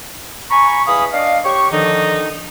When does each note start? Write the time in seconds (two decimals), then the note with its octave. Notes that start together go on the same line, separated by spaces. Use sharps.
0.50 G#5 A#5 B5 C#6
0.87 E2 F5 G#5 B5 D#6
1.12 D4 D#5 F5
1.44 G4 C#5 C#6
1.71 D3 D#3 F3 D#4